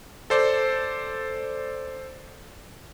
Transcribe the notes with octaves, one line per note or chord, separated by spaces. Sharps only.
A4 C5 D5